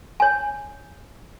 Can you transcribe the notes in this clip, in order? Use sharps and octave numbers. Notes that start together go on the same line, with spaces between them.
C#5 G#5